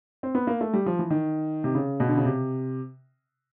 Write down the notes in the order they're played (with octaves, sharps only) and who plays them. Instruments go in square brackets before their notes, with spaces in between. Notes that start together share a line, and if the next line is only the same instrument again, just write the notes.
[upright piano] C4
B3
A#3
A3
G3
F3
E3
D#3
C3
C#3
B2
D3
C#3
C3